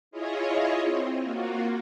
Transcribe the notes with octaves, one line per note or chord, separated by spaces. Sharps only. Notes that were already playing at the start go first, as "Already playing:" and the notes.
E4 F4 G#4 C#5 D#5
C4
A#3 F4 F#4